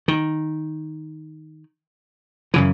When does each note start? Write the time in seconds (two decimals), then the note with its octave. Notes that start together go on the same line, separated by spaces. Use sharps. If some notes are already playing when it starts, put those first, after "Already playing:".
0.08 D#3
2.54 F#2 C#3 E3